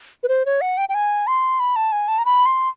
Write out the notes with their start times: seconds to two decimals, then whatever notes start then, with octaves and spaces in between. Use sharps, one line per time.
0.23 B4
0.28 C5
0.46 C#5
0.61 F#5
0.78 G5
0.89 G5
0.95 G#5
1.27 C6
1.60 B5
1.76 A5
1.92 G#5
2.08 A5
2.18 A#5
2.25 B5
2.46 C6